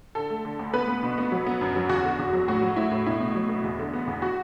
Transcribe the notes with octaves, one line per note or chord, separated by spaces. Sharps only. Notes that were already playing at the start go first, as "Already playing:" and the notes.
D3 A4
A3
D3
D2
B3 B4
B3
B2
B3
F#3
B3
F#2
F#3
E2 F#4
D3
E2
F#3
A2 F#4
F#3
A2 E4
A2
B2 E4
B2
F#3
B3
E2
D3
B3
E2
F#4